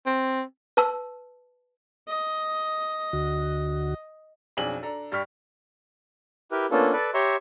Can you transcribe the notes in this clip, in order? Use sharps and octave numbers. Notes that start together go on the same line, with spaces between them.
C4
B4 A5 E6
D#5
D2 D3 F#4
B1 F2 D4 G#4 F#7
D4 A4 A#5
G2 D4 G5 C#6 F6 B6
E4 G4 A#4 B4
A#3 B3 C#4 D4 F4 A4
A4 B4 D5
G4 C#5 E5 A#5 C6 C#6